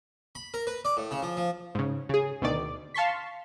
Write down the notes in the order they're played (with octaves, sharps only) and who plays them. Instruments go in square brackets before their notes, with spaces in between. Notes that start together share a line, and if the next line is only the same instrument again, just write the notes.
[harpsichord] B5
A#4
B4
D5
A2
C#3
F3
F3
[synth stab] G#2 C#3
C#3 G#4
D2 B2 D#3 D5
F5 A5 C6 C#6 B6